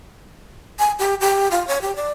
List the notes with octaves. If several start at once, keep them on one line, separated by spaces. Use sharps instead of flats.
G#5
G4
G4
F4
C#5
G4
D5